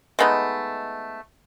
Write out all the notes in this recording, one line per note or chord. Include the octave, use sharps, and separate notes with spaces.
G#3 A3 B3 D#4